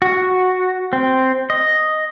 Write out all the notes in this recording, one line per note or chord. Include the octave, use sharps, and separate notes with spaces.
F#4
C4
D#5